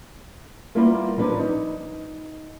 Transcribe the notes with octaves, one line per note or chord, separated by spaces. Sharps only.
G3 A#3 B3 E4 F4 A#4
D3 F3 F#3 D4 B4
D#4